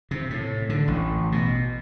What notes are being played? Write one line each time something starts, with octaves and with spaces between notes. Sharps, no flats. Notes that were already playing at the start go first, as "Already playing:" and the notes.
C3
A2
D3
A1
B2